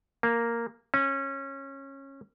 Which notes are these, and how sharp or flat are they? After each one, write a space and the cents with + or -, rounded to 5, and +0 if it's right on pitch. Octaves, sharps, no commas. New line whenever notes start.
A#3 -5
C#4 -20